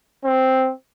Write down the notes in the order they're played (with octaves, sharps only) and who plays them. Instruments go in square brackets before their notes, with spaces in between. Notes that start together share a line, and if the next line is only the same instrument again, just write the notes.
[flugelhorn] C4